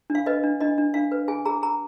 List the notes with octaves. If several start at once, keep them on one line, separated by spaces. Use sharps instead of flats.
D4
F5
B4 D#5
D4
D4 D#5
D4
D4 F5
B4
G#4 G#5
G#4 A#5
G#4 A#5